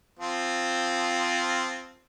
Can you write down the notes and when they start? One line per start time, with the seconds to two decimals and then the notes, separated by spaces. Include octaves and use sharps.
0.19 F3 C4 F4